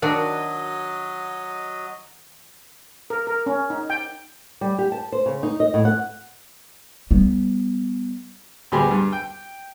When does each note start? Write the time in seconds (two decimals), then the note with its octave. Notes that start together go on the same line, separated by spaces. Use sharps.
0.02 D#3 F#3 D4 F#4 A#4 D#5
3.10 A#4
3.27 A#4
3.46 C#4
3.70 D#4
3.90 G5
4.61 G3
4.79 G4
4.92 A5
5.12 C5
5.26 C#3
5.43 D#4
5.60 D#5
5.74 A2
5.85 F#5
7.11 G3 B3
8.72 D2 G3 B3 G4 G#4 C6
8.91 G2
9.12 G5